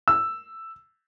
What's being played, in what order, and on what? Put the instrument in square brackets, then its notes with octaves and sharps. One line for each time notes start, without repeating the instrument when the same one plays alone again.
[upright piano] E6